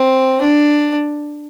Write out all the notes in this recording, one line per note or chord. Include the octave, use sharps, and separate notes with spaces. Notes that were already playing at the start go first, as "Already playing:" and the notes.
Already playing: C4
D4